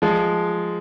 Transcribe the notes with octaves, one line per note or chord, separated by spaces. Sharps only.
F3 G#3